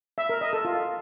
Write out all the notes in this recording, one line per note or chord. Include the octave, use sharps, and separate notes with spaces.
E5
A#4
D#5
A4
F4